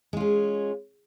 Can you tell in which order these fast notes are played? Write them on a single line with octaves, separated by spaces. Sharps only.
G#3 F4 C#4